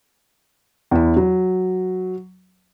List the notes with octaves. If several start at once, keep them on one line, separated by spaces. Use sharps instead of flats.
E2 E4
F#3